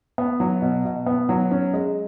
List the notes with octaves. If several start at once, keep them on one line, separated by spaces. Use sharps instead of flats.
B3
F#3
B2
B2
B3
F#3
C#4
G#3